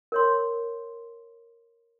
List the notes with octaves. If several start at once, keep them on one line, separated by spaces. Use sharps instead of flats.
A#4 C#5 C6